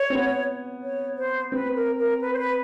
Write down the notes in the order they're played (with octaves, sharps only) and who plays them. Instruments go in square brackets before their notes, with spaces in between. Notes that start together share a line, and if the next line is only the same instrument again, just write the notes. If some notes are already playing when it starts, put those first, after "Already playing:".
Already playing: [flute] C#5
[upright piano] C4
B3
[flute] C#5
C5
[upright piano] C4 [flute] B4
[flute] A#4
A#4
B4
C5
B4